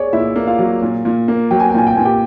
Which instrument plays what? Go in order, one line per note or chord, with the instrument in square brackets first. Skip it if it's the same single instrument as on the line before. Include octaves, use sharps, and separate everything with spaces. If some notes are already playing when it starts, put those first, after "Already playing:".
Already playing: [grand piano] G#4 C#5 D5
[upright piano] A#2 [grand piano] E4 E5
[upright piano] A#3
[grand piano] F4 F5
[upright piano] F#3
A#2
A#2
A#3
[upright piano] F#3 [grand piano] G5
[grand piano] G#5
G5
[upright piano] A#2 [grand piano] G#5
[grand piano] G5
[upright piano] A#2 [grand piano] G#5
[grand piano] G4 G5